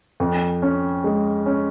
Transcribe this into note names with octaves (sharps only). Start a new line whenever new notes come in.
F2
C#4
G#3
C#4